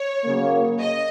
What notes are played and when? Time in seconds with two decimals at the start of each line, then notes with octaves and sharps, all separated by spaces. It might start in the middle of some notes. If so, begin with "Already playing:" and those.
Already playing: C#5
0.25 C#3 F#3 A#3
0.79 D#5